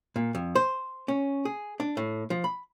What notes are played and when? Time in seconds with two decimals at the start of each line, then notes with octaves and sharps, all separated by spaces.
0.16 A#2
0.35 F2
0.55 C5
1.08 C#4
1.45 G#4
1.80 D4
1.97 A2
2.30 F3
2.44 B5